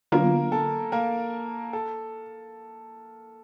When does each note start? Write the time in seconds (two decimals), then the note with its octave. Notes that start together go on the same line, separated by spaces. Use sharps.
0.12 D3 F#3 A#3 B3 D4 F4 A#4
0.52 A4
0.92 A#3 A#4
1.73 A4